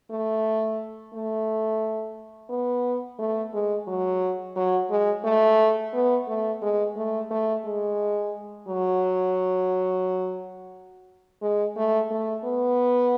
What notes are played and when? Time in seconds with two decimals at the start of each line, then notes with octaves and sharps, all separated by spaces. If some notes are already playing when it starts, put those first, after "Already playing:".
0.11 A3
1.14 A3
2.50 B3
3.19 A3
3.54 G#3
3.88 F#3
4.56 F#3
4.90 G#3
5.24 A3
5.93 B3
6.28 A3
6.62 G#3
6.96 A3
7.31 A3
7.65 G#3
8.68 F#3
11.42 G#3
11.77 A3
12.11 A3
12.45 B3